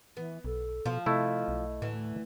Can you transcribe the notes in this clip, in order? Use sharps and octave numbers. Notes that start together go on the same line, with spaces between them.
E3 B3
B1 A4
B2 F3 F4
C3 A3 E4 D#5
B1
D2 A2 E3